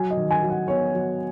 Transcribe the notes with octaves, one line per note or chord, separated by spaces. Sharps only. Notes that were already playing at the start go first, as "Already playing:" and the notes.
Already playing: F#3 G#5
D#5
D#3
G#5
F#3
F#5
B3 C#5
F#3